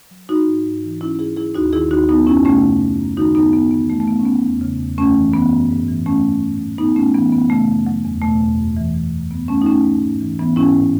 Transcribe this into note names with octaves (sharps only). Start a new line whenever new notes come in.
F#3
F#3 D#4 F#4
G#2
G#2
E3
E3 C#4 E4
G#2 E4 G#4
F#3 E4 G#4
D#2 D#4 F#4
D#3 E4 G#4
D#2 D#4 F#4
F#3 B3 D#4
F#2 C#4 E4
C#3 A3 C#4
F#2
F#3
F#2
D#3 D#4 F#4
F#2 B3 D#4
F#2 B3
E3 B3
E3 A3
A3
F#2 B3
C#4
E3 B3
E2
C#3
E2
F#2 A3 C#4
E3
E3 B3
F#2
G#2
E3
E3 A3 C#4
G#2
A2
F#3
F#3 B3 D#4
A2 A3 C#4
E3 B3
F#2 B3
C#3 A3
F#2
F#3
E2
B2 A3
E2
F#2
E3
E3
F#2
G#2 B3
F#3 A3 C#4
D#4
F#3 A3 C#4
G#2
G#2
E3
E3 B3
G#2 C#4 E4
A2